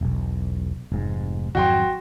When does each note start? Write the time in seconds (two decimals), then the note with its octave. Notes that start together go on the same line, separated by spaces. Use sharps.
0.01 E1 B1
0.92 F1 G#2
1.55 G#1 F2 F#3 F#4 G5 C6